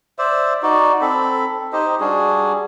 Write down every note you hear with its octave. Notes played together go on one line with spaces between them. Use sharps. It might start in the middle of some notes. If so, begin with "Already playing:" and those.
C5 D5 E5
D#4 F#4 D5
C4 A4 B5
D#4 G4 C5 D#5
G3 D4 F#4 G#4